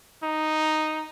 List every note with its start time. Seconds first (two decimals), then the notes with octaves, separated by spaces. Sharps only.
0.23 D#4